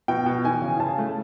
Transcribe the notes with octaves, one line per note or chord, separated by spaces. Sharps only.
B2 G5
B2
E3 G#5
C#3
C#3 A5
A3